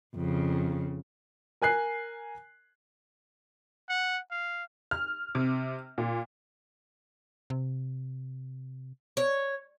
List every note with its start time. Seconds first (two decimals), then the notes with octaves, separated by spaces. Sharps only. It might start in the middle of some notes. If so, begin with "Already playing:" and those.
0.15 F2 C#3
1.62 A#4 G#5 F#6 C7
3.89 F#5
4.31 F5
4.91 F6
5.35 C3
5.98 A#2
7.50 C3
9.17 C#5